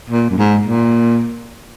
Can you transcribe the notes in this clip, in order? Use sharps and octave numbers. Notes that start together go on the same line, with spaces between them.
A#2
F#2
G#2
A#2